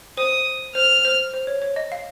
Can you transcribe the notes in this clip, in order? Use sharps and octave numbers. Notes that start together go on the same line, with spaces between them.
C5 D#6
C5 F6
C5
C5
C#5
C#5
D#5
F5